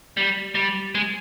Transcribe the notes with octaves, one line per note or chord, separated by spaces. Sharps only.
G3
G3
G#3